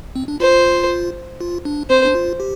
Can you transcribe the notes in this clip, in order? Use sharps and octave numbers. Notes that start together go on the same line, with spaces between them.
C4
D4
F4 C5
F4
D4
C4 C5
D4
F4
G4